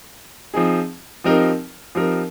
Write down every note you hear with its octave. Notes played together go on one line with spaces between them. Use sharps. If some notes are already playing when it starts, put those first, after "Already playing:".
F3 C4 D#4 G#4
F3 C4 D#4 G4 A#4
F3 C4 D#4 G4 A#4